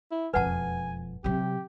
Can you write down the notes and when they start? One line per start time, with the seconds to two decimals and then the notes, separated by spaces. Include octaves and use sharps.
0.11 E4
0.34 E1 F2 B4 F#5 G#5 A5
1.24 C3 F#3 G4